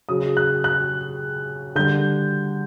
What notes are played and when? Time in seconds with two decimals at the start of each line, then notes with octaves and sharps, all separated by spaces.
0.09 C#3 F#3 D#6
0.37 F#6
0.64 F#6
1.75 D3 G3 G6